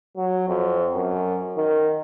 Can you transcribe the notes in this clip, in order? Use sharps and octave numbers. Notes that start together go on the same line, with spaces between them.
F#3
F2
F#2
D#3